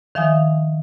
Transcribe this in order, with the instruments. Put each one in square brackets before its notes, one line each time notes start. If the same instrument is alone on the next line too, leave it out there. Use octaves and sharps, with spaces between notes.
[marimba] D#3 F3 E5 F5 G#5 D#6